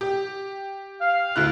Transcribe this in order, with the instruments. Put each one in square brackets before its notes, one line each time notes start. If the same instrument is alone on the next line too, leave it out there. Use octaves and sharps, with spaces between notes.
[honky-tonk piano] G4
[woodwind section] F5
[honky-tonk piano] D2 E4 F#6